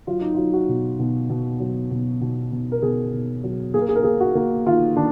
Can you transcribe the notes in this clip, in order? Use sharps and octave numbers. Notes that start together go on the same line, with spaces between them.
F#3 F4
D#4
F#3 F4
F#4
B2
B2
B2
F#3
B2
B2
B2
A#4
B2 G#4
B2
F#3
A#3 G#4
A#4
G#4
A#4
A#3 G#4
F#4
A#3
D#3 F4
D#3 D4